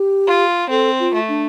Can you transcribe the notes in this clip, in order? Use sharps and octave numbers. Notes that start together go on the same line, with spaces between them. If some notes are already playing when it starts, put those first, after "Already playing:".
Already playing: G4
F4
C4 A4
F4
A3
D4